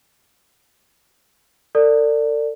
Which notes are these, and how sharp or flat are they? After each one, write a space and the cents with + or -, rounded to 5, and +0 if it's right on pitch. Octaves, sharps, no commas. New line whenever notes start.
A4 +45 D5 +0